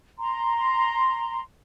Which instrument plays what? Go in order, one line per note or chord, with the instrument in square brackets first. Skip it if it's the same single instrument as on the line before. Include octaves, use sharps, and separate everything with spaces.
[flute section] A#5 C6